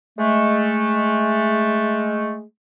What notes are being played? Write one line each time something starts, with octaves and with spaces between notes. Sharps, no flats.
G#3 A3